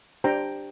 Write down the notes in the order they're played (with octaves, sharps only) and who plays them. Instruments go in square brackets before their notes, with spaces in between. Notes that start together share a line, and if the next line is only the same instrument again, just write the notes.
[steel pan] D4 G4 C5 G5 A#5